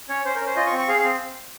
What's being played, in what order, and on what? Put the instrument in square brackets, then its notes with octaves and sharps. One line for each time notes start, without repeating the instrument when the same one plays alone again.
[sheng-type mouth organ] C#4 C#5
C#4 C5
A#4
C#4 C5
F4 D#5
C#6
C4
C#6
G#4 F5
C4 F5